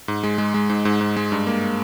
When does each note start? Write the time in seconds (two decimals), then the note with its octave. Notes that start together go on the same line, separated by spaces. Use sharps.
0.08 G#2
0.23 G#3
0.38 G#3
0.54 G#3
0.69 G#2
0.85 G#2
1.01 G#2
1.17 G#3
1.32 G2
1.47 A#3